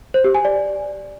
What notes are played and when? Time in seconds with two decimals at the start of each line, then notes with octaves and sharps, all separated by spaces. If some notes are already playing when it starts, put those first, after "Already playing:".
0.14 C5
0.24 G4
0.35 G#5
0.45 D5